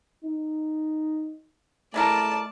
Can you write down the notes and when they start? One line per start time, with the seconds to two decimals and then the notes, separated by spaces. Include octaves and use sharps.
0.24 D#4
1.94 G#3 A3 E4 A#4 D5 A5